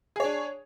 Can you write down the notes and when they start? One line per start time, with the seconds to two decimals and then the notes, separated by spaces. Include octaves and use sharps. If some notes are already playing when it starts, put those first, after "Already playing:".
0.16 G#4
0.20 C#5
0.24 D4